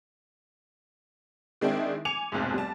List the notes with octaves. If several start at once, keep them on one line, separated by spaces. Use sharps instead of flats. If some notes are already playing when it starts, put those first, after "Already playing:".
D#3 G#3 C4 D4 E4
G#5 D6 C#7 F7
F1 B1 F2 G#2
G3 A5